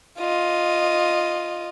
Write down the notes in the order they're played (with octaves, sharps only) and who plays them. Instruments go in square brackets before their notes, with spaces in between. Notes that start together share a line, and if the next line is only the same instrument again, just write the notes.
[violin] F4 D#5